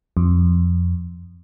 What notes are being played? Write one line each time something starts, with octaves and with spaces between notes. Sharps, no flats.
F2